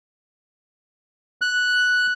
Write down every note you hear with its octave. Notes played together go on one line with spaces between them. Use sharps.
F#6